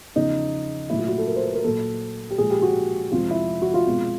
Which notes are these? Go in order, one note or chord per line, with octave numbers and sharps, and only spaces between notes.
E2 C#3 F3 D#4
A#2 F#3 A3 E4
F4
F#4
A4
A#4
C5
B4
A#4
A#2 F#3 A#3 A4
G4
A#2 F3 G#3 G#4
G4
F#4
F2 C3 F3 G#3 C4 F4
E4
F#4
F4
B2 G#3 C4